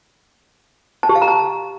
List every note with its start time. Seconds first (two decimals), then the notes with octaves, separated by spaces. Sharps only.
1.03 A5
1.09 G4
1.15 F5
1.22 A#5
1.28 A5